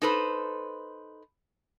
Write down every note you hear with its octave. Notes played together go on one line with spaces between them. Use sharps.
D#4 A4 B4 C5